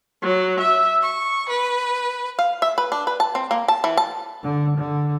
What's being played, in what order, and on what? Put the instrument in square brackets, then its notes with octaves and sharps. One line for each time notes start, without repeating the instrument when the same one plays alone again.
[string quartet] F#3
E5
C#6
B4
[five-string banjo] F5
E5
B4
D4
B4
A5
C4
A#3
A5
E3
A5
[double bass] D3
D3